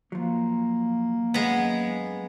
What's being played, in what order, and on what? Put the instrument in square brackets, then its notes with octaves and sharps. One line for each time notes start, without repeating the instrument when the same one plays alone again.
[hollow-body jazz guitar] F3 F#3 [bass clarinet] A#3
[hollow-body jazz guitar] F#2 [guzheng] G#3 B3